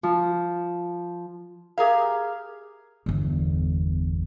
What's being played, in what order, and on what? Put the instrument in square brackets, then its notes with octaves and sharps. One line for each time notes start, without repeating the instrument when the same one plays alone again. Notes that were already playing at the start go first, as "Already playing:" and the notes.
[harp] F3
[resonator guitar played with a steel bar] G4 G#4 A#4 F5
[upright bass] G1 E2